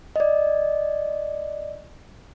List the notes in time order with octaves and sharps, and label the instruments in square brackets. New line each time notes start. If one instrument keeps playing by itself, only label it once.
[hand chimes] D5 D#5